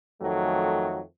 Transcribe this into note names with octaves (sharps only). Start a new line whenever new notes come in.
F2 D#3 F#3 A3